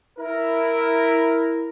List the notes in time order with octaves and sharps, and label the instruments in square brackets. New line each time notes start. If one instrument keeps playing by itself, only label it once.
[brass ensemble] E4 A#4